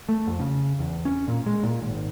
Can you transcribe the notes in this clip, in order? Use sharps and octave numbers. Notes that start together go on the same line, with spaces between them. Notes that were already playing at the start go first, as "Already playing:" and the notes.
A3
F2
C#3
E2
C#4
A#2
G#3
A#2
G#1